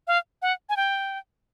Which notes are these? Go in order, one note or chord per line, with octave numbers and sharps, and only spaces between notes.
F5
F#5
G#5
G5